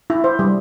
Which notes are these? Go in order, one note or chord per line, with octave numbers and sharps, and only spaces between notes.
E4
C5
G3